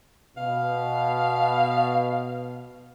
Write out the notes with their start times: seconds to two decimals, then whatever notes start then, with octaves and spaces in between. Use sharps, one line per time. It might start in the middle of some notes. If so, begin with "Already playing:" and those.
0.37 B2 F5